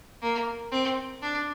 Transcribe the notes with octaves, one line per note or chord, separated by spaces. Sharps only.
A#3
C4
D4